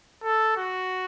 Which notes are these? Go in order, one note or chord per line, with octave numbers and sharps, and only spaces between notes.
A4
F#4